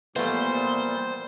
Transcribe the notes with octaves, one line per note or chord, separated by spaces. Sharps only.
A#2 E3 F3 G3 A3 B3 C5